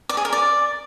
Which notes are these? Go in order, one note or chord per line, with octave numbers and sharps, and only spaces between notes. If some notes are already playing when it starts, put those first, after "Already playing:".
D5
G#4
A#4
D5